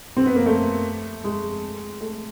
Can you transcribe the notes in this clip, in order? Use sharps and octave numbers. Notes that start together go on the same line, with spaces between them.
C4
B3
A#3
A3
G#3
A3